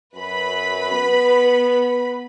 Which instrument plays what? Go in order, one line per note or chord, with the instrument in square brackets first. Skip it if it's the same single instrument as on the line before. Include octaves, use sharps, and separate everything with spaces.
[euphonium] F#2 [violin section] B4 B5
[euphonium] B3